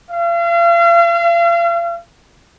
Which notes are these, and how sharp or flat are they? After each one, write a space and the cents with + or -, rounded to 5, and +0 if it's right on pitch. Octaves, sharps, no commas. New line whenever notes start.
F5 -40